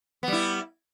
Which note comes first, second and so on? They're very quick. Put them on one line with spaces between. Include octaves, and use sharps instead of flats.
B3 G3 E4